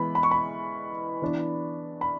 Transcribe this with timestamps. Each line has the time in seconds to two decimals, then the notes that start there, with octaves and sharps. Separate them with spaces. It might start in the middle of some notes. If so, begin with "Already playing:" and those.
Already playing: E3 G#3 B3 B5
0.15 B5
0.23 C#6
0.31 B5
1.22 E3 B3 D4
2.01 B5